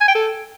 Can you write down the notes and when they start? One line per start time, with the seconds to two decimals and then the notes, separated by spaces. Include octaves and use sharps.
0.01 G#5
0.08 G5
0.15 A4